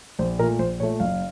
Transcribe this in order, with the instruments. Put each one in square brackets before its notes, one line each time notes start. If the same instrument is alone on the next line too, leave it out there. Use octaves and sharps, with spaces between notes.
[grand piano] A#1 C5
A#2 A#4
A3
A#1 C5
A#2 C#5
A3
F#1 F5